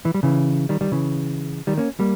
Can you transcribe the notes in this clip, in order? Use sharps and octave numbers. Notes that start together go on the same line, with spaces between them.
E3
G3
C#3 E3
D#3 G3
D#3 G3
C#3 E3
D#3 G3
A#3 C#4
G3 A#3